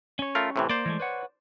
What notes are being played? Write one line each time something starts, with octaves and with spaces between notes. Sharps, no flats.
C#4 C#5
A3 F4 A#4
A2 C3 E3
A#3 C5 D5
E3 G#3 A3
B4 C#5 F#5